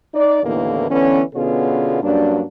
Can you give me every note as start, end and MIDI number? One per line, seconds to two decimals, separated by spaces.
0.14 0.40 63
0.14 0.40 74
0.43 0.89 39
0.43 0.89 45
0.43 0.89 50
0.43 0.89 52
0.43 0.89 58
0.43 0.89 59
0.90 1.21 50
0.90 1.21 52
0.90 1.21 59
0.90 1.21 61
1.35 2.02 47
1.35 2.02 50
1.35 2.02 59
1.35 2.02 61
1.35 2.02 65
1.35 2.02 68
2.02 2.42 43
2.02 2.42 54
2.02 2.42 58
2.02 2.42 61
2.02 2.42 62